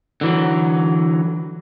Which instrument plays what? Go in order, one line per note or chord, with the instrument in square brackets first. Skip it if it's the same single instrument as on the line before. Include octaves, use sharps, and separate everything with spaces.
[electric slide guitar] D3 E3 F#3